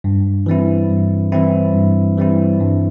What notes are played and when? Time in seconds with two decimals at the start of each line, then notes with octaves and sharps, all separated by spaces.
0.04 G2
0.46 E3 G3 C4 E4
0.90 G2
1.32 E3 G3 C4 E4
1.74 G2
2.17 E3 G3 C4 E4
2.60 G2